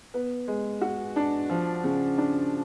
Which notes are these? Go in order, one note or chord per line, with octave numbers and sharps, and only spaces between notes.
B3
G#3
F#4
D4
F3
C#3
D4